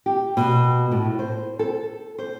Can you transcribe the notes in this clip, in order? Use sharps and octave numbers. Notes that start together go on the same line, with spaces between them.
G4
B2
A2
C5
A4
C5